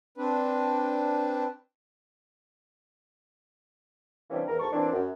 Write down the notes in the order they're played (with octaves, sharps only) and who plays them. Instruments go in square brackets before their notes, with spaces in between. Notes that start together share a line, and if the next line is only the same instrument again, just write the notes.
[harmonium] C4 D4 B4
[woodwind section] C3 E3 G3 A#3 C#4 D4
E2 A#4
D2 G#2 A5 C#6
A#2 E3 C4 D4
F#2